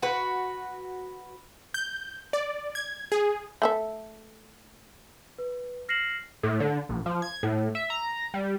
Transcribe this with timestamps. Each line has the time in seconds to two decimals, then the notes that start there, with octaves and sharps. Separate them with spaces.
0.02 F#4 B4
1.74 G6
2.33 D5
2.75 G#6
3.12 G#4
3.62 A3 A4 E5
5.38 B4
5.89 F6 A#6 C7 C#7 E7 F#7
6.43 A2
6.60 D3
6.89 A#1
7.06 F3
7.22 G#6
7.43 A2
7.75 E5
7.90 A#5
8.34 G3